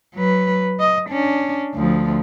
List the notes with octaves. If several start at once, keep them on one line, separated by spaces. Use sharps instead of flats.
F#3 B4
D#5
C#4 D4
D2 F3